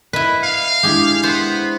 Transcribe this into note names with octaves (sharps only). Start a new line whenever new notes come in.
E4 B4 D#5
F5
G#3 D4 E4 G4 G#4
B3 C5